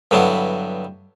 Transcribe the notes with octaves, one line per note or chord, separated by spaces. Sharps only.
G2 D3 F#3 B3 E4